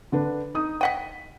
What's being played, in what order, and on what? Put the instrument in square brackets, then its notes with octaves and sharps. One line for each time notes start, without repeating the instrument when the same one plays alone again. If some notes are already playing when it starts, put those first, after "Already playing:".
[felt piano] D3 D4 B4
D#4 D#6
[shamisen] D#5 F#5 G5 [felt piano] B6 D#7